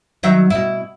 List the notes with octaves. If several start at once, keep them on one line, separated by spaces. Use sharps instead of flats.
D#3 F#3 E5
B2 E4